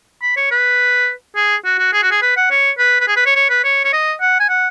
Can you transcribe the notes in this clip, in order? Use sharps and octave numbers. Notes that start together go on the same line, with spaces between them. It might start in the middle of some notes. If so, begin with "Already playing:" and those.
B5
C#5
B4
G#4
F#4
F#4
G#4
F#4
G#4
B4
F#5
C#5
B4
B4
G#4
B4
C#5
C#5
B4
C#5
C#5
D#5
F#5
G#5
F#5